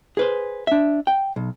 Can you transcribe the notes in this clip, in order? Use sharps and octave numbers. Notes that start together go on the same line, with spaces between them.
G#4 B4 C5
D4 E5
G5
B1